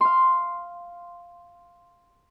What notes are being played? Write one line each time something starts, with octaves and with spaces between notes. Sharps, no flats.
F5 C6